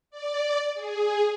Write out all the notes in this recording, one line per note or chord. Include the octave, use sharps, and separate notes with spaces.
D5
G#4